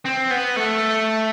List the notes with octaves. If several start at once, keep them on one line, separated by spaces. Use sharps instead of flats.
C4
B3
A3